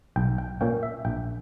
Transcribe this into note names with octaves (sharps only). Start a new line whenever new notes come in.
B1 G5
G5
A#2 A#3 C#4 G5
E5
A#1 G5